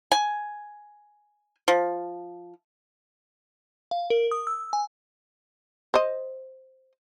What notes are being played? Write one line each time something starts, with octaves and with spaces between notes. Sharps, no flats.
G#5
F3
F5
A#4
D#6
E6
G#5
C5 D#5